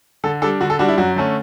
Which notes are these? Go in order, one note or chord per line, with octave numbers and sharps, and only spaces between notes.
D3 A4
G3 D4 A4
D3 F#4
A4
G3 D4 F#4
E4
F#2 F#4
D3 A3 C#4